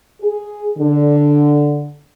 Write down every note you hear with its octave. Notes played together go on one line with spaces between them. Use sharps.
G#4
D3